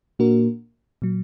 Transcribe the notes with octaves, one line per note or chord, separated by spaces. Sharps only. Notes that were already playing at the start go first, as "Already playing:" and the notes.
A#2 A#3 D4 F#4 A#4
A#2 F#3